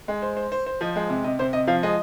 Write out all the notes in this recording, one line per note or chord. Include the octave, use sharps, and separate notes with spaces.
G#3
C5
C5
C5
C5
F3 D#5
G#3
C3
C3 D#5
C3 C5
C3 D#5
F3 F5
G#3 D#5